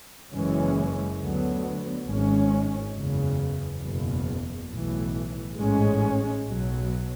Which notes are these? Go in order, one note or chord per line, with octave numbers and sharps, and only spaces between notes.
F#1 F#2 E3 G#3 C#4
D2 D3 F#3 B3
G#1 G#2 G#3 C#4
F#1 E2 C#3
F#1 E2 B2
B1 A2 E3
A1 G#2 G#3 C#4
B1 B2 F#3